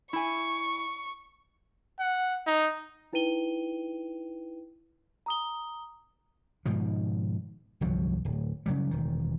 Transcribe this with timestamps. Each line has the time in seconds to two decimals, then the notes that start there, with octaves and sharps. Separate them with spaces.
0.13 E4 G#5 C#6
1.99 F#5
2.47 D#4
3.13 D#4 E4 B4 G5 D#7 G7
5.26 A#5 D#6 G7
6.66 G#2 B2 D#3 F3
7.81 G1 C2 F3 F#3
8.25 D1
8.66 C#3 F#3 G3
8.91 E1 D#3